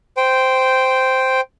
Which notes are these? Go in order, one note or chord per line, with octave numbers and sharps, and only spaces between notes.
C5 G5